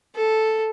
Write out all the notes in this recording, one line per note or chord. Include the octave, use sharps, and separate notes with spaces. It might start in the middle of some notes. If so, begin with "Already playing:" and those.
A4